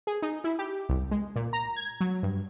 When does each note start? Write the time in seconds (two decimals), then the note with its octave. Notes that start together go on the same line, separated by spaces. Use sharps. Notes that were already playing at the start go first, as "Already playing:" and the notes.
0.07 G#4
0.22 D#4
0.44 E4
0.59 G4
0.89 C2
1.11 G#3
1.36 A#2
1.53 A#5
1.76 G#6
2.00 F#3
2.23 G2